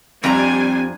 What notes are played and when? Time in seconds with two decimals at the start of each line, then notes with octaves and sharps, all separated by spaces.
0.24 F2 G3 C4 D4 G#5 A#5